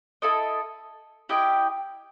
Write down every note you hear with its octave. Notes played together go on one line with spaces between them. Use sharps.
E4 A4 D#5
E4 G4 D#5 G5